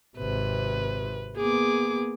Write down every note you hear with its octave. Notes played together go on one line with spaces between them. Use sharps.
G#1 C3 B4
A#3 B3 G#4 D6